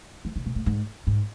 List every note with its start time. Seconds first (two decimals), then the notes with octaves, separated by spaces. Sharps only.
0.25 E3
0.36 C#3
0.46 B2
0.56 A2
0.66 G#2
1.07 G#2